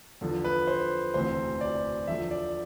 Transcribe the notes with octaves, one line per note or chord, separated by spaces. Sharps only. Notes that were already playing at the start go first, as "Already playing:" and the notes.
E2 D3 F3
B4
C5
E1 D2 C3 E3 C5
D5
E2 D3 F3 E5
D5